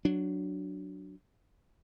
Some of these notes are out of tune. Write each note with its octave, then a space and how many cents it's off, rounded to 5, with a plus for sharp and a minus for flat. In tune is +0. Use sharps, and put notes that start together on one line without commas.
F#3 +0 D4 +0